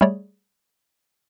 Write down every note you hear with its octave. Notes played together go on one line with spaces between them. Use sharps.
G3 A3 G#4 C#5 D5